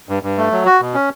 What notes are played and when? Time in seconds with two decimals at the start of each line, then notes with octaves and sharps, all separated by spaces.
0.09 G2
0.23 G2
0.38 A3
0.52 F#3
0.66 F#4
0.81 B2
0.94 C#4